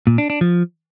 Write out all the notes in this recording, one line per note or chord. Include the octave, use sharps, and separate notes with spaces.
A#2
D4
D4
F3